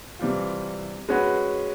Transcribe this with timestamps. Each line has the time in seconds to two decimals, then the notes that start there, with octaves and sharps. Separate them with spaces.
0.19 C3 E3 G3 C4 F4
1.09 G#3 C#4 F#4 B4